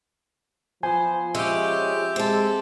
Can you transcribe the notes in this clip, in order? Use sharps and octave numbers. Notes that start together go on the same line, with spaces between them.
F3 B3 C5 G#5
G#3 C#4 G4 E5
G#3 C4 A4